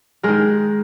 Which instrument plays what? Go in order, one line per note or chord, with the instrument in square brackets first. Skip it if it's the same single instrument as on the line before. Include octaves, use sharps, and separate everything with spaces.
[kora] D#3 G#3 A#4